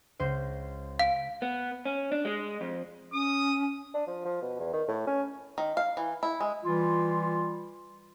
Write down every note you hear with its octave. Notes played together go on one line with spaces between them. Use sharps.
C#2 C5
F5 D7
B3
C#4
D4
G#3
F2
C#4 D#6
D4
F3
F3
B2
E2
D#3
A2
C#4
D#3
F5
E3
E4
G#3
E3 G3 F4